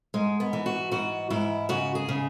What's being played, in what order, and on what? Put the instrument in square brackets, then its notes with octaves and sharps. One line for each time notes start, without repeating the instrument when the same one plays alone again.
[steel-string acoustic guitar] G#2 G#3
B3
E3
F#4
G#2 F#4
G#2 E4
C#3 F#4
G#4
C#3